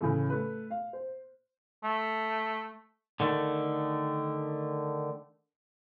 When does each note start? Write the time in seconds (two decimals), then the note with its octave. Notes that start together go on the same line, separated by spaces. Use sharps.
0.01 A2 C#3 E3 A3
0.30 A3 B4
0.70 F5
0.93 C5
1.83 A3
3.20 D3 D#3 A3